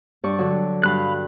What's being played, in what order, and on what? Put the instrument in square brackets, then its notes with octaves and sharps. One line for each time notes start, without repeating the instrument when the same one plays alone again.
[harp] G2 D5 C#6
D3 F#3
[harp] G2 [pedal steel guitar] F5 B5 F#6